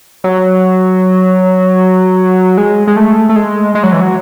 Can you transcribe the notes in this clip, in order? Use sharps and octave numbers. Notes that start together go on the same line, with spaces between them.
F#3
G#3
G#3
A3
A3
G#3
G#3
F#3
E3
F#3